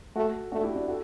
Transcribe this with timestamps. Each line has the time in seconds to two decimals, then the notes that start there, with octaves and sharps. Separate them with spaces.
0.15 A3 F#4 A4
0.52 A3 D4 F#4
0.63 E4 G4
0.75 D4 F#4
0.88 F#4 A4